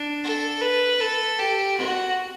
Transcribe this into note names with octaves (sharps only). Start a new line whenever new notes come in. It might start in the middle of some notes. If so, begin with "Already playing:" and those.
Already playing: D4
A4
B4
A4
G4
F#4